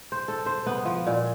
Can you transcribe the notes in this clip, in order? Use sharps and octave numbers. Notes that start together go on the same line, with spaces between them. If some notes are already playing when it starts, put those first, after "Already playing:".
C5
A4
C5
B3
F3
A#2